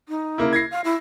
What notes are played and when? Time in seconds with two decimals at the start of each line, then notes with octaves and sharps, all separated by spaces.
0.09 D#4
0.38 C#3 A#3 E4
0.53 E4 G#6 A#6 C7
0.71 F5
0.84 E4